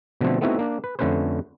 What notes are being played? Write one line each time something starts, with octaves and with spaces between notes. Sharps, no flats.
B2 D3 F3 A3 C4
A3 B3 C4 D#4 E4 F#4
A#3 D4
B4
F2 D3 A3 C#4 B4 C5